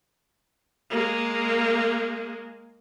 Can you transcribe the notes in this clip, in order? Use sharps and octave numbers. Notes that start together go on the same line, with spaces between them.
G#3 A#3